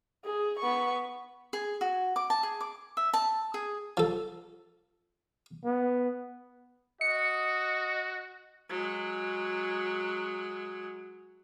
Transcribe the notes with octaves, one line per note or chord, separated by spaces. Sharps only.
G#4
B3 C#6
G#4
F#4
D6
A5
G#4
D6
E5
A5
G#4
F3 A4
B3
F#4 D#5 C#7
F#3 G#3